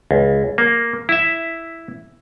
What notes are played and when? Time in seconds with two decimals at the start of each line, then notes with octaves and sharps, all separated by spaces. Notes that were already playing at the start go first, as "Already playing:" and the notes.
0.11 C#2
0.58 A#3
1.09 E4 E5